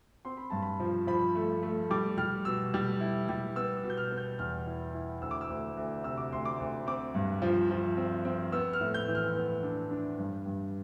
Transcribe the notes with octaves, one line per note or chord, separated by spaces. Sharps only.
C4 C6
B5
G2 A5
B5
F3
F3 B5
A3
A3
G3 D6
G3 F6
B2 E6
G3
E4
G3
B3 E6
E6
B2
G6
F6
B3
G6
E2 F6
E4
E4
D2 E6
D6
E6
D2
D2
C3 E6
D6
D2 C6
D6
D2
C4 D6
G2
F3
F3
C4
C4
B3 E6
F6
A2
G6
E3
F6
B3
D4
D4
G2
G2